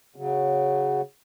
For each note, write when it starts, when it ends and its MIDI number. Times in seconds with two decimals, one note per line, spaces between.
0.16 1.01 49
0.16 1.01 54